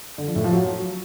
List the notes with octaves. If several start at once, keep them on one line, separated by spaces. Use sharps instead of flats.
D3
F3
A2
F3
F#3